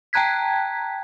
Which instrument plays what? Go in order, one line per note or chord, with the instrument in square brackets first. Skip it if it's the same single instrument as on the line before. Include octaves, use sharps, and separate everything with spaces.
[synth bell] G5 A5 A#5 F#6 G#6 B6